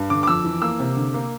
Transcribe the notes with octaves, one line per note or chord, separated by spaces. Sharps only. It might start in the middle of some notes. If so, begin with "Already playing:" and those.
Already playing: G2
D3 D6
D6
F2 E6
E3
A#3 E6
C3
D3
A#3